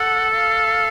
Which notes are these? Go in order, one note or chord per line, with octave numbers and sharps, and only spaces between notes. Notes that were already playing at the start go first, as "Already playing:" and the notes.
Already playing: A4 F#5
F5